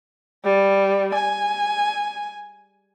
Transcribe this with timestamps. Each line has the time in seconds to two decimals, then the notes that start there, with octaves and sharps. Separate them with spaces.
0.44 G3
1.14 G#5